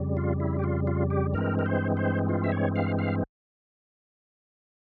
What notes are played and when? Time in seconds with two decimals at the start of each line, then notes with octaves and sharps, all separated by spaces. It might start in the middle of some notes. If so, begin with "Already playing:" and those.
Already playing: F2 C#3 G3
0.17 F4
0.40 E4
0.59 G4
0.64 F4
0.87 F4
1.10 G4
1.34 G2 E3 G#3 C4 A#4
1.59 A#4
1.66 C5
1.97 C5
2.29 F4
2.44 E5
2.52 C#5
2.76 F5
2.99 F5